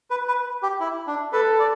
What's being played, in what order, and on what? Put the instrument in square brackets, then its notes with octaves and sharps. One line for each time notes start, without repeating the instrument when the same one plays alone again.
[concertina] B4
B4
G4
E4
D4
[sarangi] A4 [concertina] B4
[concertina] D5